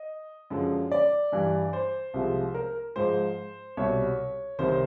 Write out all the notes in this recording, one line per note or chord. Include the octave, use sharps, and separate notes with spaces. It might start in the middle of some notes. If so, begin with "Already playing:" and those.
Already playing: D#5
F#2 D3 F3 G#3
D5
G2 E3 G3
C5
C2 C3 F3 G#3
A#4
G#2 F3 G#3 C5
C2 B2 G3 C#5
C2 C3 D#3 C5
C5